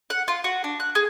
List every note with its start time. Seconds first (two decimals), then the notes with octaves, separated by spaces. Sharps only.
0.10 F#5
0.28 F4
0.44 F#4
0.64 D4
0.80 F#6
0.95 G#4